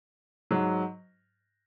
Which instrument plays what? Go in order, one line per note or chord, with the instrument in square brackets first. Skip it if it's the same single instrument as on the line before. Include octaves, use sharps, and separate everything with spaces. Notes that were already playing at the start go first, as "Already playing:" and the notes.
[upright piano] G#2 F#3